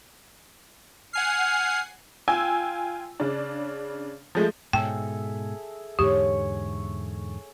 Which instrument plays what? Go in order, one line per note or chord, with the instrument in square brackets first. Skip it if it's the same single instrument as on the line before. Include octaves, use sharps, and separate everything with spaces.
[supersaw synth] F#5 G#5 C7 [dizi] F6
[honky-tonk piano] F4 G5 G#5 E6
C#3 D4
F3 G#3 A3
[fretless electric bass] G#2 B2 [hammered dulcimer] G#4 A4 E5 [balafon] G5
[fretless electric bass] E2 G#2 D3 [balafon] G4 [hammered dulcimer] C#5